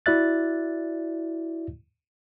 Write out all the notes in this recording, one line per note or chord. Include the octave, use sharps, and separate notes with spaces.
E4 F#4 D5 E5 F#6 A6